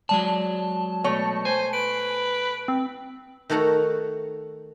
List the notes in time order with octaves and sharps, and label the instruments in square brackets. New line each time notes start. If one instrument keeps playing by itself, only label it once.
[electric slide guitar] F#3 G#3 D5 [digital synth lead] A5
[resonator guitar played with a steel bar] B2 A3 C#5
[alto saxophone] C5 [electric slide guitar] G#5
[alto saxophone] B4 [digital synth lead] D7
[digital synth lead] C4
[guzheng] D#3 A3 F#4 A4 F#5 A#5